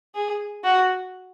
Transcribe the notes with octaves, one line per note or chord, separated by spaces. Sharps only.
G#4
F#4